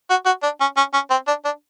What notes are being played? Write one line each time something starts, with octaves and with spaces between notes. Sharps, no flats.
F#4
F#4
D4
C#4
C#4
C#4
C4
D4
D4